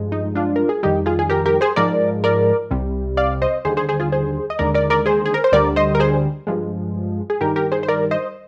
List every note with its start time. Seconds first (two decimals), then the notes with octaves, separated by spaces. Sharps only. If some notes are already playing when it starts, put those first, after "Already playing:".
Already playing: G2 F3 G#3
0.12 D#4
0.35 D4 F4
0.56 A#4
0.69 G#4
0.83 F2 D#3 G3 D#4 G4
1.06 F4 G#4
1.19 G#4
1.30 G4 A#4
1.46 G4 A#4
1.61 G#4 C5
1.76 G#2 F3 G#3 A#4 D5
2.24 A#4 D5
2.71 C2 C3 G3
3.17 D5 F5
3.42 C5 D#5
3.65 D#2 D3 G3 G#4 C5
3.77 G#4 C5
3.89 G#4 C5
4.00 F4 G#4
4.12 G#4 C5
4.50 D#5
4.59 D#2 D3 G#3 A#4 D5
4.74 A#4 D5
4.90 A#4 D5
5.06 G#4 C5
5.26 G#4
5.34 A#4
5.44 C5
5.52 D2 D3 G3 A#4 D5
5.76 C5 D#5
5.95 A#4
6.00 G#4 C5
6.47 G2 F3 G#3
7.30 G#4
7.41 G2 D#3 G3 G4 A#4
7.56 G4 A#4
7.72 G#4 C5
7.83 C5
7.88 A#4 D5
8.11 C5 D#5